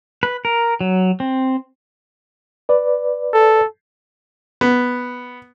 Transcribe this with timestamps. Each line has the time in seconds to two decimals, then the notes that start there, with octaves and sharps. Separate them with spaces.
0.23 B4
0.45 A#4
0.81 F#3
1.20 C4
2.69 B4 D5
3.34 A4
4.61 B3